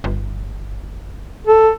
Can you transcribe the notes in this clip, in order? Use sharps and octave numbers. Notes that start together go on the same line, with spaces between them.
G1
A4